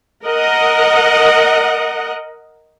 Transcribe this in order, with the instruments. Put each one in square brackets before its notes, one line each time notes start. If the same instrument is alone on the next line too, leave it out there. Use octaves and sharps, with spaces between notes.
[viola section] A#4 D#5 F#5